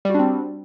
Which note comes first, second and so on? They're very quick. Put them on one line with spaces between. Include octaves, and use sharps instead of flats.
G3 F#4 D4 C4